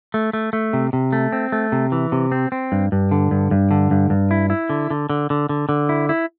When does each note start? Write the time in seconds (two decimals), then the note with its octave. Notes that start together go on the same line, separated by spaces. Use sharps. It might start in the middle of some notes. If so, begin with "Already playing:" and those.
0.14 A3
0.33 A3
0.53 A3
0.73 C3
0.93 C3
1.13 A3
1.33 C4
1.52 A3
1.72 C3
1.92 E3
2.12 C3
2.32 C4
2.52 C4
2.72 G2
2.92 G2
3.12 D3
3.31 G2
3.51 G2
3.71 D3
3.91 G2
4.10 G2
4.31 E4
4.50 E4
4.70 D3
4.90 D3
5.09 D3
5.30 D3
5.49 D3
5.69 D3
5.89 E4
6.09 E4